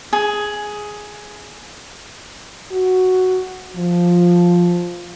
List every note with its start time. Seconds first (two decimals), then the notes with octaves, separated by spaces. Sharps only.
0.13 G#4
2.72 F#4
3.77 F3